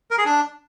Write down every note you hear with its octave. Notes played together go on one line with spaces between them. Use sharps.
A#4
G#4
D4